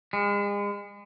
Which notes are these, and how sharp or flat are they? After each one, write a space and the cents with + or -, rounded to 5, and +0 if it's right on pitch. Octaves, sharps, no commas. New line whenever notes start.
G#3 -35